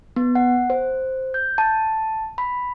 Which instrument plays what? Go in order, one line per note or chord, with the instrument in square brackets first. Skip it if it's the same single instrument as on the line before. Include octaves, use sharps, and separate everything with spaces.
[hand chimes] B3
F#5
C5
G6
A5
B5